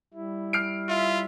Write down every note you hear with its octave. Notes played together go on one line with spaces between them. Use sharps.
G3 E4
F6 C7 D7
F4 E5